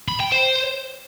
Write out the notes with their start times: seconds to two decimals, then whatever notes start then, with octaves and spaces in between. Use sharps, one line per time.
0.09 B5
0.20 G5
0.32 C5